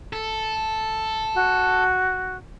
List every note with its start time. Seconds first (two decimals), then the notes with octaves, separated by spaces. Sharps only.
0.13 A4
1.34 F#4